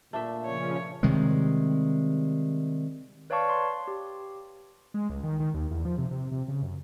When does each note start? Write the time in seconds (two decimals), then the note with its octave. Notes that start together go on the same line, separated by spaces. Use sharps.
0.13 A#2 A3 D4 E5
0.46 C#3 F3 C#4 C#5
1.03 C3 D#3 G3 G#3
3.30 B4 C#5 D5 F5 A5 C#6
3.50 C6
3.88 G4
4.94 G#3
5.10 C#2
5.24 D#3
5.40 D#3
5.54 D#2
5.71 E2
5.85 F3
5.98 C3
6.11 C3
6.32 C3
6.48 C#3
6.63 F#2